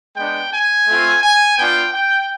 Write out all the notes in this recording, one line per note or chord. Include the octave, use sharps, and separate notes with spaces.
G#3 B3 D4 G5
G#5
A3 C4 F4
G#5
B3 D4 F4 G5
G5